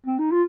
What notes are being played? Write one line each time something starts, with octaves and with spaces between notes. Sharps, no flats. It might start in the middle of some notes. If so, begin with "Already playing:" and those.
C4
D#4
F4